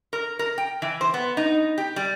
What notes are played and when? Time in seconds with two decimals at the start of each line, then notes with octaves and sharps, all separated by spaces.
0.13 A#4
0.39 A#4
0.58 G5
0.82 E3
1.01 C5
1.14 B3
1.37 D#4
1.78 G4
1.96 G3